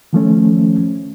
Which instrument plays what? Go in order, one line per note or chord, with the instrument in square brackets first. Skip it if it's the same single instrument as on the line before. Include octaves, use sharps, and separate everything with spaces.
[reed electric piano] D#3 F3 A3 C#4